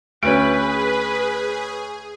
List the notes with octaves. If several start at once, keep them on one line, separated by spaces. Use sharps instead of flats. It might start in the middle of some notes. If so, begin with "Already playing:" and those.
D2 C#4 G#4 B4 D7